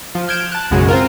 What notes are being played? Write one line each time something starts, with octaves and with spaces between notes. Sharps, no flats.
F3
F6 G6 G#6 D7 E7
A5 F#6
B1 F#2 C#3 G#3 F#4 G#4
C4 F4 A#4